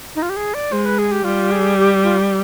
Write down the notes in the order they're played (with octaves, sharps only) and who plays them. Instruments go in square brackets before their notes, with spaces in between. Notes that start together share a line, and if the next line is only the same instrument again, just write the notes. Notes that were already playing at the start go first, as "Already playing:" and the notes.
[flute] D#4
F4
G4
G#4
D5
[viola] G#3 [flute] C5
[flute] B4
G#4
G4
[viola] G3 [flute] F4
[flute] G#4
G4
F4